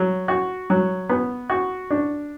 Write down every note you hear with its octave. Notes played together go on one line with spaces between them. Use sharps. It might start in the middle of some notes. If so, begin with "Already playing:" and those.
Already playing: F#3
F#4
F#3
B3
F#4
D4